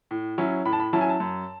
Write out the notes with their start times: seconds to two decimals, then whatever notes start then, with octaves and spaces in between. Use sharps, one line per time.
0.11 A2
0.38 F#3 C#4 E4
0.65 A2 B5
0.73 A5
0.80 B5
0.93 F#3 C#4 E4 A5
1.01 G#5
1.09 A5
1.20 F#2